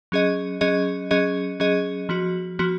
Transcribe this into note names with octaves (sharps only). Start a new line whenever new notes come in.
F#3 C#4 G#4 D#5
F#3 C#4 G#4 D#5
F#3 C#4 G#4 D#5
F#3 C#4 G#4 D#5
F3 B3 F#4
F3 B3 F#4